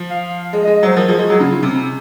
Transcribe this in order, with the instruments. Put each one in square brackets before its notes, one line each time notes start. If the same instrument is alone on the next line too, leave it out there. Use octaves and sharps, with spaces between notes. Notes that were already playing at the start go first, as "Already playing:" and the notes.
Already playing: [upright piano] F3
[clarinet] F5
[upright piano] G#3 [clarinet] D#5
[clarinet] D#5
[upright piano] G#3
[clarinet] D#5
[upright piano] F#3 [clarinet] C5
[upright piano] F3 [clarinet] A#4
[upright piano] F3 [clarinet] G#4
[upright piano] G#3 [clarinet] F#4
[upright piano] F#3 [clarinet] G#4
[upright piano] C#3 [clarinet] F4
[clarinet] D#4
[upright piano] C3 [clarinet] C#4
[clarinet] C#4
C#4